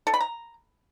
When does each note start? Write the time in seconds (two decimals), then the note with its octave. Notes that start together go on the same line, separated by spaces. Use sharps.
0.07 A4
0.14 B5
0.21 A#5